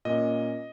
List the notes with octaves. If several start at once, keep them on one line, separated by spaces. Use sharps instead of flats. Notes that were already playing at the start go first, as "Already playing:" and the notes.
A#2 A#3 C#4 D#5